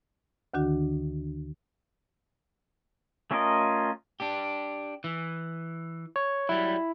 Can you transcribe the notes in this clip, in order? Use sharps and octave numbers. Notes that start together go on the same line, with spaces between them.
D2 D3 D#3 D4 F#4
A3 C#4 F4 A#4 D#5
D4 G4
E3
C#5
F#3 G3 E4